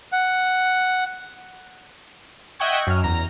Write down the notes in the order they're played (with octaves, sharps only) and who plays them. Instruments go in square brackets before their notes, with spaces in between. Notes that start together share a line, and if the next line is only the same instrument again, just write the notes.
[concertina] F#5
[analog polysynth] D#5 E5 F#5 G5 C#6 G#6
F#2 F6
E2 A#5